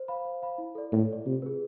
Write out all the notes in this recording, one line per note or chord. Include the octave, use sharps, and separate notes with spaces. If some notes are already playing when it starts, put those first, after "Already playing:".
Already playing: C5
F5 B5
C5
F5 B5
E4
A4 D5
A2 E4
A4 D5
C3 F4
G#4 B4